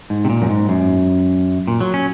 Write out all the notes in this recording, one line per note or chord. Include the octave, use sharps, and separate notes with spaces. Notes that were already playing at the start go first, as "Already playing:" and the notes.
G#2
C3
A#2
F#2
G#2
F#2
A#2
F#3
C#4